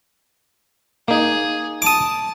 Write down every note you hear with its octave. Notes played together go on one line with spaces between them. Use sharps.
A#3 D#4 G#4
A5 D6 D#6